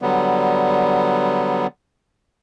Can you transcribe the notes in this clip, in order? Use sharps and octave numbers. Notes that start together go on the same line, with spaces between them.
D3 F#3 G3 B3